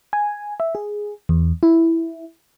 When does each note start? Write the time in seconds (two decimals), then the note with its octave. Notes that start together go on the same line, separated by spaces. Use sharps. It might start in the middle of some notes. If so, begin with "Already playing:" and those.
0.13 G#5
0.60 E5
0.75 G#4
1.29 E2
1.63 E4